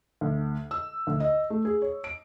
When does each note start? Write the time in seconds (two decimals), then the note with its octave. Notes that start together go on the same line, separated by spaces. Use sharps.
0.21 D2
0.71 E6
1.07 D2
1.20 D#5
1.50 A3
1.65 G#4
1.82 C#5
2.04 D7